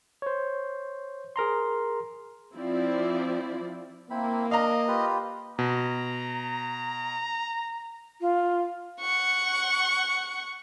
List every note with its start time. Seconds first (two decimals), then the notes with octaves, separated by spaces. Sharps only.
0.22 C5 C#5
1.36 G#4 A#4 A#5 C6
2.56 F3 C4 E4 F4 D5
4.10 A#3 C4 E4 B5
4.51 D4 D#5 F5 A#5
4.88 F4 G4 B4
5.59 B2 A#5
8.21 F4
9.02 F#5 C#6